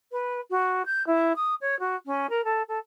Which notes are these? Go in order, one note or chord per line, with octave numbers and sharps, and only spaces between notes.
B4
F#4
G6
E4
D#6
C#5
F#4
C#4
A#4
A4
A4